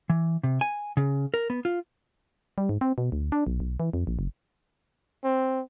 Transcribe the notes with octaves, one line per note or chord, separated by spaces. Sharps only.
E3
C3
G#5
C#3
A#4
B3
F4
G3
G#2
C4
B2
D2
D4
B1
B1
E3
F2
A#1
F#1
C4